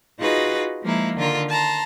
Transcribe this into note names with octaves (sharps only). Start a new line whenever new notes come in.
D#4 F4 F#4 G#4 B4 D#5
F3 G#3 A#3 D#4 E4
D3 D#3 F4 A#4
A5 A#5 C6